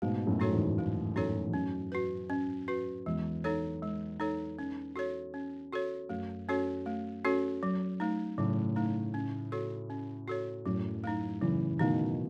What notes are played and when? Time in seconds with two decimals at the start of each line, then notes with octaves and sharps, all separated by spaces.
0.02 G#2 B2 A3
0.27 F#2 A2
0.40 D#4 F#4 A4 C#5
0.52 E2 G#2
0.78 A3
1.16 F#2 A2 D#4 F#4 A4 C#5
1.47 E2
1.53 F#2 C#4
1.92 F#4 B4
2.30 C#4
2.68 F#4 B4
3.06 E2 G#3
3.44 D#4 A4 C#5
3.83 G#3
4.20 D#4 A4 C#5
4.59 C#4
4.96 F#4 A4 C#5
5.34 C#4
5.73 F#4 A4 C#5
6.09 F#2 A3
6.49 C#4 F#4 A4 C#5
6.86 A3
7.25 C#4 F#4 A4 C#5
7.63 F#3
8.00 A3 D#4
8.38 A2 C#3 F#3
8.76 A3 D#4
9.14 C#4
9.52 F#4 A4 C#5
9.90 C#4
10.28 F#4 A4 C#5
10.66 F#2 A2 F#3
11.04 A3 D#4
11.42 C#3 E3 F#3
11.80 B2 D#3 A3 D#4